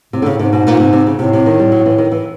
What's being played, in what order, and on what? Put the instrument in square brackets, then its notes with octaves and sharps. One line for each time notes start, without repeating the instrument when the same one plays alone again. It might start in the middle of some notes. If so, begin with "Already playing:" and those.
[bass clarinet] A2 [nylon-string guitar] C3
[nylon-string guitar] D3
C#3
[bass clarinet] A2
[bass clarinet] G#2 [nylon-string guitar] C3
[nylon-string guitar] B2
A#2
C3
C3
C#3
[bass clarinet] A2 [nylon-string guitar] C3
[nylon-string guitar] C3
D#3
G3
F#3
E3
D#3
E3